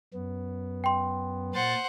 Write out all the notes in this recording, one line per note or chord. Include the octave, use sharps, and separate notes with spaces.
F#2 B3
G5 C6
A#2 C5 F#5 A6